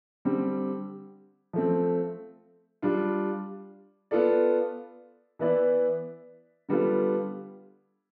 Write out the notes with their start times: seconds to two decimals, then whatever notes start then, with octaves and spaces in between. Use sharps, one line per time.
0.25 D3 G3 C4
1.53 F3 A3 C4
2.82 G3 D4 F4
4.11 B3 F4 A4 D5
5.39 E3 B3 E4 B4 D5
6.69 D3 G3 B3 F4 A4